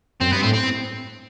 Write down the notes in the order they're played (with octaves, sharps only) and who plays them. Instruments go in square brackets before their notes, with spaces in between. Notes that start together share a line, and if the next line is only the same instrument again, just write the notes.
[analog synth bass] F#2 [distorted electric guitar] C4
[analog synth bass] G2 [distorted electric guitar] B3
[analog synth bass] A2 [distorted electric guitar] C4
[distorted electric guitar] C4